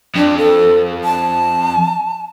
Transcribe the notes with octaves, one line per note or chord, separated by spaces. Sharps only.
F2 D4
A4
A5